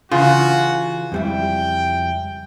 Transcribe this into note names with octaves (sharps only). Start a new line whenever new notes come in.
C#3 E3 F4 F#4
F2 G3 E4 G5